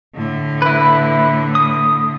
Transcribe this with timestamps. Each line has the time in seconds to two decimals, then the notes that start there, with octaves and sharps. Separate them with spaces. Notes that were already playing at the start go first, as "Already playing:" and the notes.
0.15 A2 D3
0.62 E4 B4
1.55 D#6